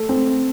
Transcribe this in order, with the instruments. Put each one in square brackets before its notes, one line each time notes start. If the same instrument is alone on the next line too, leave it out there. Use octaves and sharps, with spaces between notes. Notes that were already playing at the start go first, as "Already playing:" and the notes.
Already playing: [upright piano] A3
C4